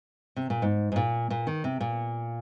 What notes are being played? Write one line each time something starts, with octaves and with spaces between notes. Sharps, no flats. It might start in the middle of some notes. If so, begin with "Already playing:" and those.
C3
A#2
G#2
G#2
A#2
A#2
D#3
C3
A#2